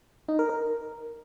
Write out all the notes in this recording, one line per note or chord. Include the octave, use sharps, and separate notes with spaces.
D#4
A#4
A#4